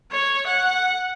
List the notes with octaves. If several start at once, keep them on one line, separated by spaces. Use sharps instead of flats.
C#5
F#5